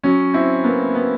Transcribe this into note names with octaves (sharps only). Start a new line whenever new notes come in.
F#3 C#4
C4 E4
A#3 B3
B3